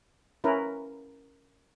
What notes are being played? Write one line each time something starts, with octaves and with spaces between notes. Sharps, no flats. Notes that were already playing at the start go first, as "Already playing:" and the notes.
C#4 E4 A#4 B4